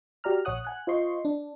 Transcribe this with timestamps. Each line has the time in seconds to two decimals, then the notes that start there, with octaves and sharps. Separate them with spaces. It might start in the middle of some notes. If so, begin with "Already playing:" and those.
0.24 F#4 G4 D5 A#5 F6
0.45 A#1 C#5 F#5 D#6 F#6
0.65 F#5 G#5 F#6
0.87 F4 C5 D#5 C6 C#6
1.25 D4